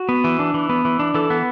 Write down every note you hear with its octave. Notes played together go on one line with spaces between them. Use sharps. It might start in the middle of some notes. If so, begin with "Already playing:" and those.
Already playing: F#4
B3
E3
D4
E3
B3
E3
D4
E3 A4
B3